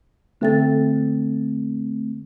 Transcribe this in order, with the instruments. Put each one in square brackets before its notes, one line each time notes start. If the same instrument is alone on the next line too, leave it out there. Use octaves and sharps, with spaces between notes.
[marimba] D3 A4 A6 [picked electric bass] A3 C4